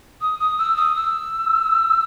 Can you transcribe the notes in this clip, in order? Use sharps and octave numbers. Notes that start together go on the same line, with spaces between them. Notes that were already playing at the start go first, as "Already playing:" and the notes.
D#6
D#6
E6
D#6
E6